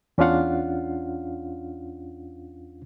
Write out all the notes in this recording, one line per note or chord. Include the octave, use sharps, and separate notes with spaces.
E2 C#4 D4 F4 F5 F#5